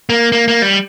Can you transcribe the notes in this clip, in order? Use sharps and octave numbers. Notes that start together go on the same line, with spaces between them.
A#3
A#3
A#3
G3